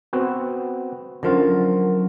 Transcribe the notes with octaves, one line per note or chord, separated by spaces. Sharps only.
B3 C4 F#4
D3 F3 F#3 C#4 F4 A#4